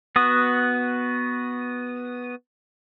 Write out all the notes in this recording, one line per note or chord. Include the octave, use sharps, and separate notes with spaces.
B3 F#4 D#6